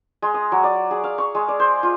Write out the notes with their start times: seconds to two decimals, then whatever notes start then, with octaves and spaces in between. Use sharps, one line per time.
0.22 G#3
0.34 D#6
0.52 F#3
0.64 D5
0.91 G#4
1.04 F5
1.18 C#6
1.35 G#3
1.48 D5
1.60 C5
1.83 F4